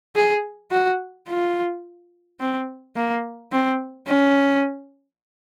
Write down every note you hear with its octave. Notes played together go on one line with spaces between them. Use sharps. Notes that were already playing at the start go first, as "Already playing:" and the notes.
G#4
F#4
F4
C4
A#3
C4
C#4